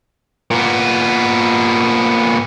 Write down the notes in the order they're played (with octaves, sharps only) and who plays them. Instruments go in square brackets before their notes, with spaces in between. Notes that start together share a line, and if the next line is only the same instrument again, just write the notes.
[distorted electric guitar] A#2 B3